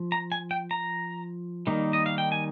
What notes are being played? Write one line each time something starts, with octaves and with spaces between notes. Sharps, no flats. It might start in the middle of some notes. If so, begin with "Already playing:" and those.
Already playing: F3
A#5
G#5
G5
A#5
D#3 G3 A#3 D#4
D#5
F5
G5
G#5